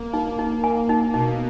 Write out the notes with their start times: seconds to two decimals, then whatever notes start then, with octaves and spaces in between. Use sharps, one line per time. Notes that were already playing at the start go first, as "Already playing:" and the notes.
Already playing: A#3
0.13 A#3 D#4
0.39 D#4
0.64 G#5
0.89 D#4
1.14 B2 D#4